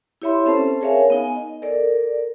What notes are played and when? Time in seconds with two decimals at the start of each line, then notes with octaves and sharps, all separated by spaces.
0.22 E4 G4 C#5 E5 B5 C6
0.46 C4 C#4 A4 C5 A5
0.81 G#4 A#4 C#5 E5 F5 G#5
1.10 B3 D#4 G#5
1.36 D#5
1.62 A4 A#4 D5